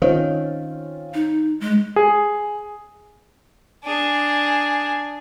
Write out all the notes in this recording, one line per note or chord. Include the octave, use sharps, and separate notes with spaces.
D#3 C4 C#4 F4
D#4
G#3
G#4
D4 G#4